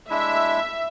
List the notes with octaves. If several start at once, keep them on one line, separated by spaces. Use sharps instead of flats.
G#3 D4 E4 E5